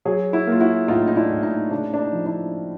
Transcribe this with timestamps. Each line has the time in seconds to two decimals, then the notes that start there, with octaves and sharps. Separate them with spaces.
0.05 F#3 F#4 G#4
0.33 E4 F#4
0.47 A#3
0.52 F4
0.60 E4 F#4
0.88 A2 D#4 F4
1.08 D#4
1.16 D4 E4
1.30 A2
1.43 D#4
1.71 C#3 D4
1.94 D4
1.99 D#4
2.13 F3
2.26 D4 E4